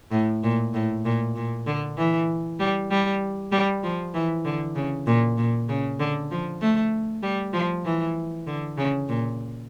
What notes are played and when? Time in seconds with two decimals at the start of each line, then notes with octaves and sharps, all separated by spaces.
0.12 A2
0.43 A#2
0.74 A2
1.05 A#2
1.36 A#2
1.67 D3
1.97 E3
2.59 G3
2.90 G3
3.52 G3
3.84 F3
4.14 E3
4.45 D3
4.75 C#3
5.07 A#2
5.37 A#2
5.68 C#3
5.99 D3
6.31 F3
6.61 A3
7.22 G3
7.53 F3
7.85 E3
8.47 D3
8.78 C#3
9.09 A#2